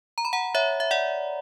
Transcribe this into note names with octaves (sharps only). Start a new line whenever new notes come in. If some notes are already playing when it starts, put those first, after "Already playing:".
A#5
B5
F#5 A#5
C#5 E5
E5
D5 F#5